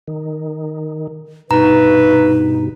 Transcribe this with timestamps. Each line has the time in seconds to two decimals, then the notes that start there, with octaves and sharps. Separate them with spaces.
0.08 D#3
1.51 G2 B2 D#4 B4 A#5